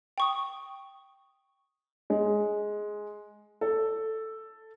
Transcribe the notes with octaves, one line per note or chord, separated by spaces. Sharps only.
G5 C#6 D#6
G#3
A4